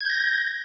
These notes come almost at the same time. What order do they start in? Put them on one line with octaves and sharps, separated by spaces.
G#6 G6 A#6